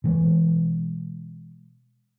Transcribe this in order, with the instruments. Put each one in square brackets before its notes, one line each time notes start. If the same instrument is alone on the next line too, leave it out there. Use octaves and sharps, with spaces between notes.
[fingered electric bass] B2 E3 G#3